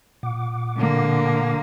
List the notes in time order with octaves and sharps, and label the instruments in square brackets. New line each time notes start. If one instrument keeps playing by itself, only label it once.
[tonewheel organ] A#2 F#5 D6
[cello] D3 A#3